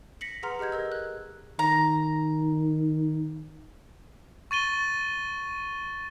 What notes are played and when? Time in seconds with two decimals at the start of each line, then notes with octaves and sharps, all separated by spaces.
0.21 A#6 B6 C#7 F#7
0.43 G#4 B4 F#5 A#5 C6 F6
0.59 G4 G#4 D#5 G6 G#6
0.72 A#4 D#5 E6
0.92 F#6
1.59 D#3 A#5
4.51 C#6 A6 D#7 G7